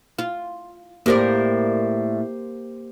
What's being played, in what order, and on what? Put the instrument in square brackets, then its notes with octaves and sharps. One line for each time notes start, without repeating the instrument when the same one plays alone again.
[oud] F4
[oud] A2 A#4 D5 [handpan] A#3 G4 C5